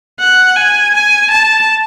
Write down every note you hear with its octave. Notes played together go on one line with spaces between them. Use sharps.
F#5
G#5
G#5
A5